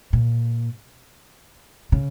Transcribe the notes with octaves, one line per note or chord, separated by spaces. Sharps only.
A#2
C#3